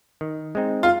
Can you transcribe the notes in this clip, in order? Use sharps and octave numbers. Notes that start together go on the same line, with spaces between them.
D#3
G#3 C4 D#4
F4